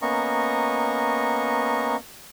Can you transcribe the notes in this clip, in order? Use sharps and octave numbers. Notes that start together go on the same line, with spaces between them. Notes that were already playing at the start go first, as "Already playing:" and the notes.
A#3 B3 C#4 D#5 A#5 C#6